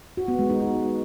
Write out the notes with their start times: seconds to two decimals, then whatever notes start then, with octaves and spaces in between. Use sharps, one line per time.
0.17 F#4
0.28 B3
0.39 G#3
0.50 D#4
0.60 F#4